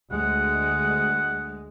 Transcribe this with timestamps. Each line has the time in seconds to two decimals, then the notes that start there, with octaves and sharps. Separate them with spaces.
0.11 D2 G#3 F#5